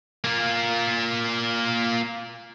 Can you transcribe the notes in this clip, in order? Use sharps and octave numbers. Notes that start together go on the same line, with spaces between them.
A#3 F4